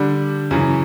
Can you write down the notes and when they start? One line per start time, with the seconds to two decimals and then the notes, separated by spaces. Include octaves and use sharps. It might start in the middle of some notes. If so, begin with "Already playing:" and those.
Already playing: D3 G3 D4
0.51 F#2 C#3 E3